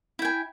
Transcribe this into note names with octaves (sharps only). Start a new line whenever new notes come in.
E4 G5 G#5